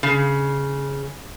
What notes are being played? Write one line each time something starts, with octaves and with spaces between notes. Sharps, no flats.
C#3